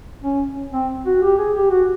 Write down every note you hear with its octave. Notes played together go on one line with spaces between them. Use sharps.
C#4
C4
F#4
G4
G#4
G4
F#4